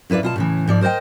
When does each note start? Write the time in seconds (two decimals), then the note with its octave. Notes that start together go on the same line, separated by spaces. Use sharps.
0.10 F#2 E4 B4 D5 F5
0.23 B2 F4 A5
0.36 A2 C#3 E3
0.67 G#2 F3 D5
0.81 A#4 C5 C#5 D#5 G5